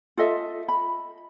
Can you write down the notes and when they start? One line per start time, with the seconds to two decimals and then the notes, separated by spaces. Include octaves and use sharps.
0.17 F4 A4 D#5 E5
0.68 B5